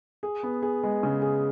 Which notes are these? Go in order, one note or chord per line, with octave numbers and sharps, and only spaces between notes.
G#4
B3
G#4
G#3
C#3
G#4